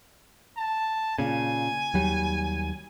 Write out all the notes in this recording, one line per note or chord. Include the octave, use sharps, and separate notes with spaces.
A5
A#2 C#3 G#5
D#2 F#3 G3